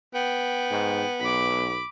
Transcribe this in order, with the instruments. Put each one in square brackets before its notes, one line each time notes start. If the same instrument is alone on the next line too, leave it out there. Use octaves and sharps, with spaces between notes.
[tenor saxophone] B3 [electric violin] G5
[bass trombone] G#2
[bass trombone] B1 [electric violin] B5 D6